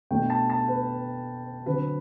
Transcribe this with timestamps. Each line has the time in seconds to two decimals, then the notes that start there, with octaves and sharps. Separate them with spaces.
0.11 B2 A3 D4 G5
0.30 A5
0.50 A5
0.68 B4
1.66 D3 F#3 C4 B4